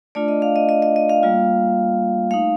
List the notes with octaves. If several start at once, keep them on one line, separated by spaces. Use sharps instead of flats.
A3 D4 F4 D5
D#5
F5
D#5
D#5
D#5
D#5
F5
G3 A#3 F4
A3 D#4 F5